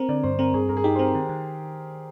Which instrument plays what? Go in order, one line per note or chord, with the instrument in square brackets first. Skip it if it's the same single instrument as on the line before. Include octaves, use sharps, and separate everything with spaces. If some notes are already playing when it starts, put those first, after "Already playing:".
Already playing: [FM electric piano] C4 [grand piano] A#4
[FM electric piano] D3 [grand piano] D5
[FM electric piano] G2 [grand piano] C5
[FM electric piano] C4 [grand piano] A#4
[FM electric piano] G2 [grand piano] G#4
[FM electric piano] G2 [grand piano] A#4
[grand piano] G#4
[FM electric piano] D#4 [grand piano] G4
[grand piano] C5
[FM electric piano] C4 [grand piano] A#4
[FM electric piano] D#3
D#3